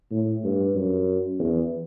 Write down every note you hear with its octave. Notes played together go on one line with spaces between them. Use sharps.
A2
G2
F#2
E2